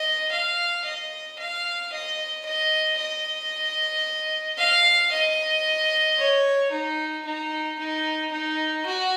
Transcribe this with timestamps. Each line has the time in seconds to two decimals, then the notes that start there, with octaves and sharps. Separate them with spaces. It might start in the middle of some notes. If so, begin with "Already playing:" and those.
Already playing: D#5
0.31 F5
0.85 D#5
1.39 F5
1.92 D#5
2.45 D#5
2.98 D#5
4.58 F5
5.11 D#5
6.18 C#5
6.72 D#4
7.25 D#4
7.79 D#4
8.31 D#4
8.85 F#4